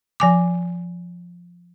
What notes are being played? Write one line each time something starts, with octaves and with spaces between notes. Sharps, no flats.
F3 G#5 D6